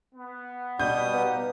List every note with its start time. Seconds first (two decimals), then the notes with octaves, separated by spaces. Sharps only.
0.14 B3
0.79 B2 G3 D#6 G6
1.14 B3 D#4 G4 F5